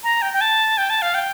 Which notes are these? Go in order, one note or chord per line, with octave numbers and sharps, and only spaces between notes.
A#5
G5
G5
A5
G5
A5
F5
G5